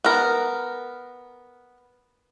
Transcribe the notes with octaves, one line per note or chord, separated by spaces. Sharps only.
B3 A#4